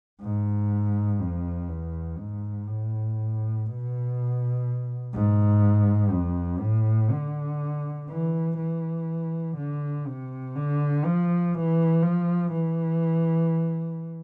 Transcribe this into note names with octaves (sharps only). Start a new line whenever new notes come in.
G#2
F2
E2
G#2
A2
B2
G#2
F2
A2
D3
E3
E3
D3
C3
D3
F3
E3
F3
E3